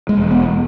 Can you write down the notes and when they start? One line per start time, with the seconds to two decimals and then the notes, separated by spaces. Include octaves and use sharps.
0.09 G#3
0.17 E1
0.31 B3